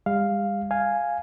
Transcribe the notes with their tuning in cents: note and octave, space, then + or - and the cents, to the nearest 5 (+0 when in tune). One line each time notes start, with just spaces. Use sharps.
G3 +45 F5 +0
F5 +0 G#5 +0